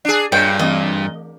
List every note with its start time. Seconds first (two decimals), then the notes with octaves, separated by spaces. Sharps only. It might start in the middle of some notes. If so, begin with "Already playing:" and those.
0.05 D4 G#4
0.32 G2 A#2 C#5 D#5 G5 C#6
0.59 E3 A3 C4 D#5